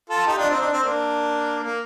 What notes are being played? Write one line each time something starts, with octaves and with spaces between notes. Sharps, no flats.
F4 A4
D#4 G4
D4 F4
C4 D#4
D4
C4
A#3 D4
A#3